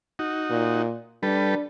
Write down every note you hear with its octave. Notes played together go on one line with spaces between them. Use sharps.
D#4 F#4
A#2
G3 D4 A4 B4